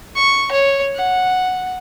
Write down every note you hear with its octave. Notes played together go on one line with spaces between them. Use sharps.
C#6
C#5
F#5